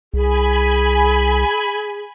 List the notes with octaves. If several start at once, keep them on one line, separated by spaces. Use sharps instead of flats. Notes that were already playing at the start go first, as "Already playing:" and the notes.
C2 G#4 G#5 B5